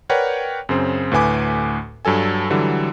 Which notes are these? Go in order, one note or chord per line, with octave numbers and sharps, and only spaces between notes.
A#4 B4 C#5 D5 F#5 G5
F#2 C#3 C4 C5
D2 A2 B4 G#5 D6
G2 F#3 A4 G#5
D3 E3 F#3 G3